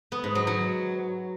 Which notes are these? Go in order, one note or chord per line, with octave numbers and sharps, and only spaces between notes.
B3
G#2
F#3
F#3